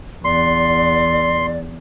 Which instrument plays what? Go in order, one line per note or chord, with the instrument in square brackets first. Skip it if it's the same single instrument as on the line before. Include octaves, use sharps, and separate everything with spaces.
[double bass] E2 [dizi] D5 [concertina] C6